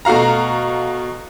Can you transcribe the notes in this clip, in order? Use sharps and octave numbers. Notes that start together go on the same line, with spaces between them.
B2 A3 F#4 F5 A#5